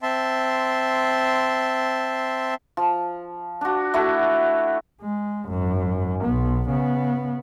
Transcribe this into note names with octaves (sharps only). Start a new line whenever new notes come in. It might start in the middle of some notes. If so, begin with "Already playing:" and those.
C4 E5 A5 C6
F3
D4 F#4
A3 E4 F#4
G#3
G#1 F#2
B1 B3
C#3 B3